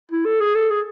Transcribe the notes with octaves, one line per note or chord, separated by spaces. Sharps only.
E4
A4
G#4
A4
G#4